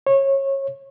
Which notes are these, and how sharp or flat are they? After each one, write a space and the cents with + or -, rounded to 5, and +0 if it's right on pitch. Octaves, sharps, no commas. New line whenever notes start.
C#5 -25